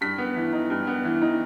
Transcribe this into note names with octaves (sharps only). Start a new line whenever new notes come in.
G2 B6
B3
E3
D#4
G2
B3
E3
D#4